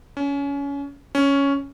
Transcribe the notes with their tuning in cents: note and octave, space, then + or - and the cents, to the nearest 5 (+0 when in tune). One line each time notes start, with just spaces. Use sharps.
C#4 +25
C#4 +5